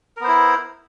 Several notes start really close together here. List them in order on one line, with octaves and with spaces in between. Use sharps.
A#4 B3 C5 E4